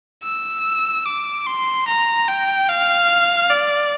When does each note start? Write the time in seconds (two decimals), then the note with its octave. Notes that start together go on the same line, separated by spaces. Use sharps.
0.23 E6
1.06 D6
1.46 C6
1.87 A#5
2.28 G5
2.69 F5
3.50 D5